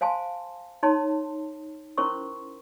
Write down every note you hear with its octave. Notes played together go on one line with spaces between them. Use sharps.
C5 F5 G#5 A5 C6
D#4 C#5 A5 C6
C#4 E4 A#4 C5 C6 C#6